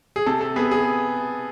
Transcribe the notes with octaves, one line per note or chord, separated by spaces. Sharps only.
G#4
C3 A4
A4
B3 G#4
G#4